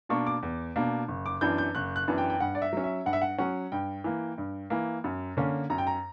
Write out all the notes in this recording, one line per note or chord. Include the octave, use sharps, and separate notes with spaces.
B2 A#3 D4 C#6
D6
E2
B2 A#3 D4
F#1
D6
F#2 E3 B3 D4 G6
G6
F#1 F#6
F#6
F#2 E3 B3 D4
G5
G5
G2 F#5
D5
E5
F#3 C#4
E5
G2 F#5
E5
F#5
F#3 C#4 F#5
G2 G5
E3 A#3
G2
E3 A#3
F#2
D3 A#3 C#4
F#2 A#5
G5
A#5